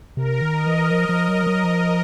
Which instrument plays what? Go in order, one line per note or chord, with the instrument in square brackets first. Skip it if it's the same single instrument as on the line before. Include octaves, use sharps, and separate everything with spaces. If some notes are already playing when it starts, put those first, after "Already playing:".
[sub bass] C3 [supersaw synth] A#4
[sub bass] D#3
[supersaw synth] D#5
[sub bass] E3
F3
F3
F#3
F3
F#3
F3